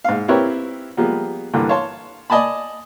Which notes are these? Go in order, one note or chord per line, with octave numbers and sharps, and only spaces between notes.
G#2 F5
C4 E4 G4 A#4 B4 C#5
F3 G3 G#3 A#3 B3
G2 D3 E3 A#3
C#5 F5 A5 C6
D5 D#5 G#5 A5 B5